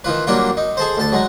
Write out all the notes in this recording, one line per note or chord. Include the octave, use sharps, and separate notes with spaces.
D#3 E3 F4 B4
F#3 G3 A#3 D4 E4 F4
D#4
G#4 A4 C5
D2 A4 A5
F#3 G#3 D#4